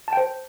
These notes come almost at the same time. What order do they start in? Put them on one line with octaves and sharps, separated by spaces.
A5 G5 C5